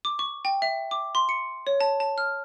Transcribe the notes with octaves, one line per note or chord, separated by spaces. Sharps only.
D6
C#6
G5
E5
D6
C6
C#7
C#5
A5
A5
F6